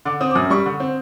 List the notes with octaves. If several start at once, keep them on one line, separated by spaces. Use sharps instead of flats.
D3 D6
C4 D#6
D6
F#2 D#6
G3 C#6
D3
C4